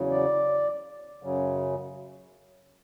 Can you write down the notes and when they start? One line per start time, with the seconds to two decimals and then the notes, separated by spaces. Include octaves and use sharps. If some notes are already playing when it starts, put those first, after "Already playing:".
Already playing: E2 C#3 F#3
0.12 D5
1.23 F#2 C#3 F#3